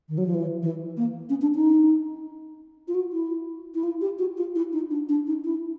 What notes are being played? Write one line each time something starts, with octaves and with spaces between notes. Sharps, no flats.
D#3
F#3
F3
E3
E3
A#3
C#4
D4
D#4
F4
F#4
E4
E4
F4
G4
F#4
F4
E4
D#4
D4
D4
D#4
E4